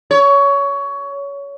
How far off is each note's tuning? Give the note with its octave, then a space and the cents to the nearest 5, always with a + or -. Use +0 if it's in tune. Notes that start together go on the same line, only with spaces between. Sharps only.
C#5 +20